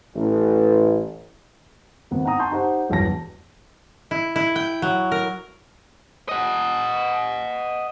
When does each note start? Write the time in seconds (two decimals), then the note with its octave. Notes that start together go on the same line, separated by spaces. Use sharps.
0.15 A1
2.11 G#1 B3
2.25 D#4 F#5 G5 A#5 D#6
2.39 G#5 A5 C6 C#6 G6
2.51 D#4 G4 C5 F#5
2.89 E1 B1 E2 G2 A5 A#6
4.11 E4
4.36 E4
4.56 G5
4.82 F#3
5.11 A#4
6.29 D#5 F#5